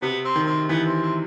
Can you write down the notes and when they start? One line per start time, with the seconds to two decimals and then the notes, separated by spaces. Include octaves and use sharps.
0.02 C3 B3
0.25 C4
0.36 D#3
0.47 C4
0.69 E3 B3
0.87 C4
1.03 C4